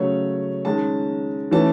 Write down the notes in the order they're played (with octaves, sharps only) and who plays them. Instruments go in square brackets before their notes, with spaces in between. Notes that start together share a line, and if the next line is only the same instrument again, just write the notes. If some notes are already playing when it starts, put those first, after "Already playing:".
Already playing: [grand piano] C#3 F#3 A3 C#4 C#5
D#3 G#3 C#4 A5
E3 A3 C#4 A5